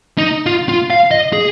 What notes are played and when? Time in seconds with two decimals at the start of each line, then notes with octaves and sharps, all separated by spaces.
0.18 D#4
0.46 F4
0.69 F4
0.90 F5
1.11 D#5
1.33 G#4